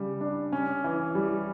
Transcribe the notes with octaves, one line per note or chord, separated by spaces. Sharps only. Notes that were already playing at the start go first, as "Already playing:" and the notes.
Already playing: C#3 G3
D4
C#4
E3
G3